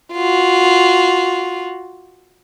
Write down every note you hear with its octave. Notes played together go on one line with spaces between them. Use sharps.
F4 F#4